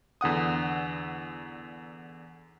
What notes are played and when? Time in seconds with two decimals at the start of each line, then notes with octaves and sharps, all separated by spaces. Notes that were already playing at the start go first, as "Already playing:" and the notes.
0.21 E2 D3 F#5 D#6